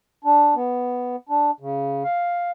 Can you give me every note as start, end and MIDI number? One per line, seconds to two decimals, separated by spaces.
0.24 0.55 62
0.55 1.16 59
1.29 1.51 62
1.60 2.04 49
2.04 2.51 77